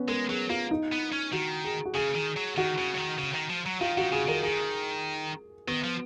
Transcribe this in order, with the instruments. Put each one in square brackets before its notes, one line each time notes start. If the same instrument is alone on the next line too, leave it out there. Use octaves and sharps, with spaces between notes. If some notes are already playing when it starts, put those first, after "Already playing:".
Already playing: [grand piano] B3 C#4
[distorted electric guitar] G#3 [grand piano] A#4
[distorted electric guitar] F#3 [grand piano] G#4
[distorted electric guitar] A#3 [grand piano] F4
[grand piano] D#4
[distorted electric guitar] B3
C#4
[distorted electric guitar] D#3 [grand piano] F#4
[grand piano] G#4
F#4
[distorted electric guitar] C#3 [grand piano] G#4
[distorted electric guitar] D#3
F#3
[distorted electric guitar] D#3 [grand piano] F#4
[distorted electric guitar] C#3
C#3
D#3
C#3
D#3
F3
F#3
[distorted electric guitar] D#3 [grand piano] F4
[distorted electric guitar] D#3 [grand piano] F#4
[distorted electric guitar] C#3 [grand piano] G#4
[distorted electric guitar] D#3 [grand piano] A#4
[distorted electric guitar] D#3 [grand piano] G#4
[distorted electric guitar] D#3 [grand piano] B3
[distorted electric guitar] F3